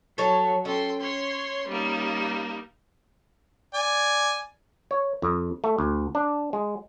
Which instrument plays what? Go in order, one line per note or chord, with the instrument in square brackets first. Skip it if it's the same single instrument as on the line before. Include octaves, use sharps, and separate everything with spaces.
[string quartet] F#3 [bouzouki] A4 C#5
[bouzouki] C#4 [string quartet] A4 G5 C6
[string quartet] C#5 C6
G3 A#3 D#4
[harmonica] D5 G#5
[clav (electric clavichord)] C#5
F2
A3
D2
D4
G#3